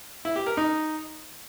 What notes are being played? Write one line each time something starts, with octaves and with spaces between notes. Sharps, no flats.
E4
G4
A#4
D#4